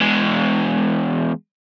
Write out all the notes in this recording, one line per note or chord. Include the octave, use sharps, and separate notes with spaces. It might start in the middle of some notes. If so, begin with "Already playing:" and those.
E2 G#3